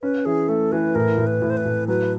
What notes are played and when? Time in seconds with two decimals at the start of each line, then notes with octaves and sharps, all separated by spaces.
0.02 C#4 B4
0.25 E3 G#4
0.48 A3 A4
0.72 E3 B4
0.95 A2 A#4
1.18 A2
1.27 B4
1.42 A2
1.50 C5
1.57 B4
1.65 A2
1.88 F#3 B4